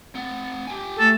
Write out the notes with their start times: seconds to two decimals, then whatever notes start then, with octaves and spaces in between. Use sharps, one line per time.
0.15 C4 F#5
0.67 G4 G5 G#5
0.99 A3 A4